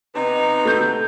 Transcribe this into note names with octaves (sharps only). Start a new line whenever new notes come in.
C3 B3 D#4
A3 G6